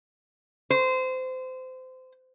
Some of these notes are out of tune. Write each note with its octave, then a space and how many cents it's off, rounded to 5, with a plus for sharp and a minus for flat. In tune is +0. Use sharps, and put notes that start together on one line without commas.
C5 -25